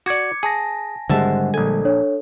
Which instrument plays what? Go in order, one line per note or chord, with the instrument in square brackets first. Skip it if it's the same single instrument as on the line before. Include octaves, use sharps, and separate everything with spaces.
[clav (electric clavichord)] F#4 D5 [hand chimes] D6 G#6 C#7
[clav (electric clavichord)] G#4 [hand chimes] G#5 A5 A#6
[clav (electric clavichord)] G#1 E5 A5 [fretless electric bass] D3 G3 G#3 [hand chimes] C5 F#5
[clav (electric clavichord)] A#1 G#5 [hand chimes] A4
[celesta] D4 C#5